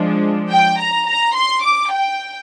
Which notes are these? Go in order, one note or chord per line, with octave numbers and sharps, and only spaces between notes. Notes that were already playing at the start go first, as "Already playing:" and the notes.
Already playing: F3 G#3 D4
G5
A#5
A#5
C6
D6
G5